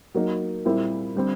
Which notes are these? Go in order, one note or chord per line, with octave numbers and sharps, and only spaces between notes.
F#3 A#3 D#4
A#2 G3 C4 E4
D3 G3 C4